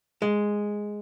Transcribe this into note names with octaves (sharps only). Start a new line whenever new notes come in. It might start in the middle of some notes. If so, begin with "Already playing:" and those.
G#3